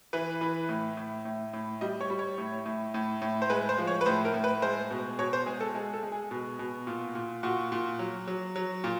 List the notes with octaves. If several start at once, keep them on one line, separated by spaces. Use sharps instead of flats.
E3 B4
E3
A2
A2
A2
A2
G3 D#5
C#5
G3
C#5
A2
A2
A2
A2
C5
G#3 B4
C5
F3
C#5
B4
A2 C5
A#4
A2
B4
G#3 C5
B2
B2 C#5
C5
G#3 G#4
A4
G#3
A4
G#3
G#4
B2
B2
A#2
A#2
A#2 F#4
A#2
F#3
F#3
F#3
A#2